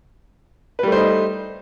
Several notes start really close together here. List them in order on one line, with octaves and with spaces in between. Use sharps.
B4 G3 A3 C5 D#4